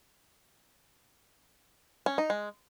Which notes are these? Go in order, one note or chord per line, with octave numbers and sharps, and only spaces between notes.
C#4
D#4
G#3